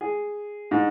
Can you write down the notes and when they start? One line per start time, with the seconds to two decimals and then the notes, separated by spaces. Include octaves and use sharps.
0.01 G#4
0.71 G#2